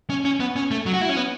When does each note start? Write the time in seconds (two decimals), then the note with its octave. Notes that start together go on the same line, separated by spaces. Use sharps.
0.10 C#4
0.25 C#4
0.40 B3
0.56 C#4
0.71 A3
0.86 F#3
0.94 F#4
1.01 E4
1.09 C#4
1.16 B3